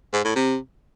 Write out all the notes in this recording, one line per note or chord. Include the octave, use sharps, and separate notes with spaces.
G#2
A2
C3